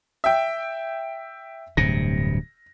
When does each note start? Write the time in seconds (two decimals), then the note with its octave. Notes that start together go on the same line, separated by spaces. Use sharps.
0.24 E5 G5
1.77 D1 G2 C3 A#6